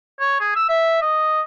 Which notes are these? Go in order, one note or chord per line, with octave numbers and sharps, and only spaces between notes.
C#5
G#4
E6
E5
D#5